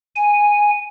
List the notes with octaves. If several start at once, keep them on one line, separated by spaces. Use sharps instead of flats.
G#5